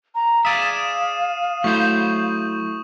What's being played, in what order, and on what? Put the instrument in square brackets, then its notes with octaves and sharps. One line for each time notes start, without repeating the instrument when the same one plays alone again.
[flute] A#5
[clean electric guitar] G#4 D5 E5 [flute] F5 [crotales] D#6 D#7 E7
[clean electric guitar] F#3 C5 [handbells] A3 E4 G6 [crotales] C#6